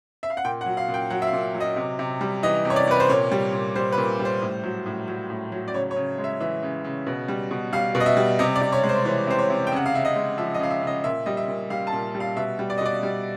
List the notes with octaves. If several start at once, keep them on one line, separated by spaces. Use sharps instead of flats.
E5
F5
F#5
A#2 G5
F#5
F#3
F5
A#2
G5
F#3 F#5
E5
F5
A#2
F#3
D#5
C3
C3
G3
E3 D#5
C3
C#5
D5
C3 B4
C5
A#2 C#5
G3
A#2
G3 C5
B4
A#2
G3
C5
A2
F#3
A2
F#3
A2
F#3
D5
C#3 C#5
C#5
C#3
G#3
E5
E3 E5
C#3
C#3
B2
G3
B2
G3 F5
B2
D#5
E5
G3
C3 D#5
D5
C3
C#5
G#3
C5
E3 C#5
C3 C5
C#5
C3
G5
C#3 F#5
F5
C#3 E5
D#5
G#3
F3 E5
D#5
C#3 F5
E5
C#3 D#5
A#2 E5
G3 D#5
E5
A#2
G3 F5
A5
A#2
G3
F5
B2 E5
G3
D5
D#5
B2 D5
G3